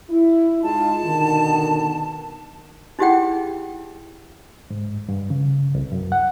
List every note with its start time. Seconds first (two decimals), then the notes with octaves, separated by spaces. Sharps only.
0.10 E4
0.63 G#3 D#4 F4 A5
1.04 B2 D3 D#3
2.99 D#4 E4 G4 G#4 F#5 G5
4.71 G#2
5.09 G2
5.30 C#3
5.75 C2
5.92 F#2
6.12 F#5